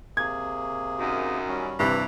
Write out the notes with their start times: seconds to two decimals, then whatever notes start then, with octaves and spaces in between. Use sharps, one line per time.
0.17 C3 A#3 G#4 G#6
0.99 F#2 D#3
1.48 G3 C#4
1.79 G2 C3 E3 G4